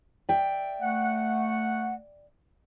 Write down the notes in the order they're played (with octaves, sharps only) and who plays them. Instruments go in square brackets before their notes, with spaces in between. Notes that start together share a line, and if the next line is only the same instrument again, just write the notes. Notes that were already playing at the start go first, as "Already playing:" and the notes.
[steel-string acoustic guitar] D5 E5 G5
[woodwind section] A3 F#5